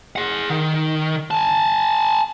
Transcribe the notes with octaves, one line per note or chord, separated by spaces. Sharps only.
G#4 F#5
D#3
G#5 A5